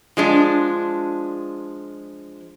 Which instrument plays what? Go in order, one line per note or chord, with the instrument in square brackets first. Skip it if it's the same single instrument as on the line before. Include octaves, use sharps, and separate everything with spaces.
[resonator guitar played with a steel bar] F3 G#3 D4